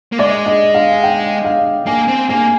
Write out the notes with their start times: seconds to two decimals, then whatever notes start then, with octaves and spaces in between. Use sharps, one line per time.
0.13 A#3
0.19 G#3 D5
0.46 D#5
0.74 F5
1.04 G5
1.45 F5
1.87 A#3 G#5
2.08 C4
2.29 A#3 G#5